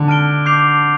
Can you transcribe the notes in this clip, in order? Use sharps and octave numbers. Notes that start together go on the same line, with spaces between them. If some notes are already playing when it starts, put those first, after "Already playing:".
Already playing: D3
A5 F6 D7 G7
D6 G6 C7 F7